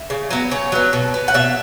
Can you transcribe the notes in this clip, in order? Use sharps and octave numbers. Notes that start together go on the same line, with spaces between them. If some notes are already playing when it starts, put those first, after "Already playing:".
Already playing: E5
C#3
F#3 B3
C#3 C#5
F#3 B3
B2
B3
F#5
B2 E5